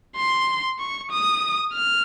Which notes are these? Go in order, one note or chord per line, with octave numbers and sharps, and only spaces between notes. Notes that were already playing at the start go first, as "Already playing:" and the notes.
C6
C#6
D#6
F6